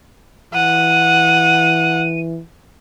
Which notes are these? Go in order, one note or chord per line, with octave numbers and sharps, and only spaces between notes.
E3 F#5 D#7